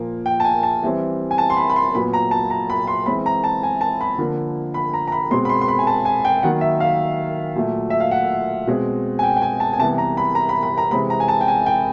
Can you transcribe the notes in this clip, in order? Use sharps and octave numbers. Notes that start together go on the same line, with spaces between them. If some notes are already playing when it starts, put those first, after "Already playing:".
Already playing: A#2 F3 A#3
G5
A5
G#5
A5
E3 G3 C4
G#5
A5
C6
B5
B5
C6
A#2 F#3 B3 B5
A#5
A5
A#5
B5
C6
E3 G#3 C4 B5
A#5
A5
G#5
A5
B5
D3 F3 A#3
B5
A#5
A#5
B5
B2 G#3 C4 C6
B5
C6
C6
B5
G#5
A5
G#5
G5
D#3 F#3 A#3 F#5
E5
F5
A#2 F#3 A3
E5
F5
F#5
B2 G#3 C4
G#5
G5
G5
G#5
A5
G#5
C3 E3 G3 B3 A5
A#5
B5
A#5
B5
B5
A#5
C3 E3 G#3 C4 B5
A#5
G#5
A5
G5
G#5
G5